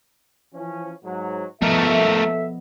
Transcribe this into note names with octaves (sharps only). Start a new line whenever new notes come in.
E3 F3 C#4
G#2 F#3
F3 A3 B3 A4 A#4 D#5 E5